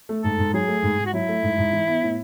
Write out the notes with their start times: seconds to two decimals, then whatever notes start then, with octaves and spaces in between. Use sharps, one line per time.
0.09 A3
0.23 G#2 A4
0.38 G#2
0.53 F#3 G#4
0.68 A3
0.83 G#2
0.98 G#2
1.06 F#4
1.13 F#3 E4
1.28 A3
1.43 G#2
1.58 G#2
1.73 E3
1.87 B3
2.03 A2